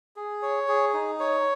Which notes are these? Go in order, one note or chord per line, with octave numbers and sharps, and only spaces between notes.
G#4
C#5
G#4
D#4
C#5